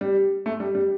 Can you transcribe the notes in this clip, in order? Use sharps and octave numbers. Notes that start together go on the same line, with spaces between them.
G3
A3
G3
G3